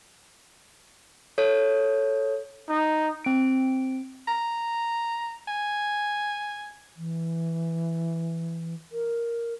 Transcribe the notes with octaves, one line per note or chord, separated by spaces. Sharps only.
A4 C#5
D#4
C4 D7
A#5
G#5
E3
A#4